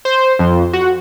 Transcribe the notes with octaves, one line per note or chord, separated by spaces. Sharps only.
C5
F2
F#4